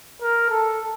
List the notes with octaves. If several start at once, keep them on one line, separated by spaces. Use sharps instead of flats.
A#4
A4